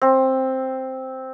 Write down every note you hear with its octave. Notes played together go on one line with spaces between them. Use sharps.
C4